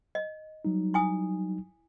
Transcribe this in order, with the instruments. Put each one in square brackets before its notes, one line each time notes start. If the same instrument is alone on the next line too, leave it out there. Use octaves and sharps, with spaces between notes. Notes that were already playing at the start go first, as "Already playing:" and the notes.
[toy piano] D#5
[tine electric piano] F#3 G3 D#4
[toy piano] E4 G#5 D#6